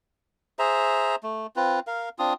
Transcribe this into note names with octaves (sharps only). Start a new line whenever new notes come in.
G#4 C5 E5 A#5
A3
C4 F4 B4
A#4 F5
C4 D4 F4 D#6